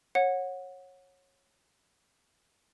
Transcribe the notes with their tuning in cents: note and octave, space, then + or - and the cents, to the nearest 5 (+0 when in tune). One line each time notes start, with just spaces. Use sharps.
C#5 -20 F#5 -20